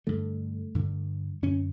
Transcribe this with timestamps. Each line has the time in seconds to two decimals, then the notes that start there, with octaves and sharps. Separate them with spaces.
0.07 G2 D3 A3
0.75 G2 D3
1.42 F#2 D3 C#4